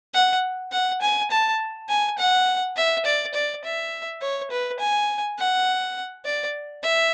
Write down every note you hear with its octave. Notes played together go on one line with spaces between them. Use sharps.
F#5
F#5
G#5
A5
G#5
F#5
E5
D5
D5
E5
C#5
B4
G#5
F#5
D5
E5